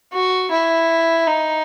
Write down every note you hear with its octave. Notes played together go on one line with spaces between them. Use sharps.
F#4
E4
D#4